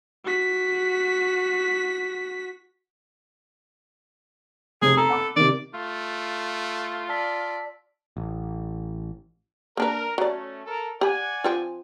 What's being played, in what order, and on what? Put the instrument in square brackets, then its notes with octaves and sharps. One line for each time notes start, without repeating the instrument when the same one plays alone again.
[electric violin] F#4 B6
[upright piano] F1 [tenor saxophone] G#4
[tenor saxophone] A4 [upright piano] A#5
[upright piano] F#5 B5 D6
[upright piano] C3 D#3 [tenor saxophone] D5
[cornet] A3 [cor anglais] F4
[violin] D5 [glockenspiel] A5 E6 B6
[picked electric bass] A1
[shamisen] A#3 D4 B4 [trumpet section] A#4
[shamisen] F#3 D5 [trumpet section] A3 C#4
[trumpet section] A4 A#4
[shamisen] G4 B5 [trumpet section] D5 F#5 G#5
[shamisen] F3 C4 F4